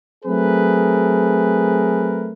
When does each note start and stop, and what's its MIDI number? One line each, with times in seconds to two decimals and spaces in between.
0.25 2.33 54
0.25 2.33 57
0.25 2.33 60
0.25 2.33 68
0.25 2.33 70
0.25 2.33 71